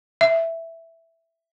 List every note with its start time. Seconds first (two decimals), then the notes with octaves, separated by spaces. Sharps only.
0.21 E5